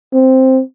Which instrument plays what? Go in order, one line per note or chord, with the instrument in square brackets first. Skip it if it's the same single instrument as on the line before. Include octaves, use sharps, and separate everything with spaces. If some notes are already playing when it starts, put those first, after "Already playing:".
[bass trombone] C4